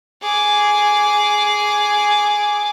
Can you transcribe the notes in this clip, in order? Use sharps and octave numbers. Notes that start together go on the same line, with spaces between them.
G#4 D6